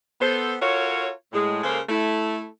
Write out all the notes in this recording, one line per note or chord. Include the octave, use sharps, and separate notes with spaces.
B3 A4 C5
F4 F#4 A4 A#4 C#5
A2 G#3
C#3 G#3 A#3 A4 A#4 C5
A3 E4